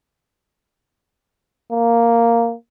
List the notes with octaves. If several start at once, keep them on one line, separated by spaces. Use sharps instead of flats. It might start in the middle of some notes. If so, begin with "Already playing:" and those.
A#3